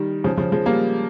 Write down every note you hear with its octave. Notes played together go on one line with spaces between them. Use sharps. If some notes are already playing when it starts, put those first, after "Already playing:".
Already playing: D#3 G3
C#3 F3
C#3 F3
F3 G#3
G3 A#3